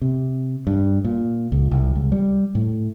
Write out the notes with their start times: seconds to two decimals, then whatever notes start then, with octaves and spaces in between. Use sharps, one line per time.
0.02 C3
0.67 G2
1.05 A#2
1.52 C#2
1.71 C2
1.95 C#2
2.12 G3
2.55 A2